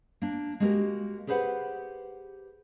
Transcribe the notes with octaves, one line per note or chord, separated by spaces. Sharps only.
A#3 D4
G#3 A#3 F#4 G4 A#4
G4 G#4 B4 C5 F5 F#5